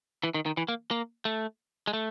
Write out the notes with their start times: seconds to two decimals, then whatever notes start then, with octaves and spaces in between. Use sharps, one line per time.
0.23 E3
0.34 D#3
0.46 D#3
0.57 E3
0.68 A#3
0.91 A#3
1.25 A3
1.87 G#3
1.93 A3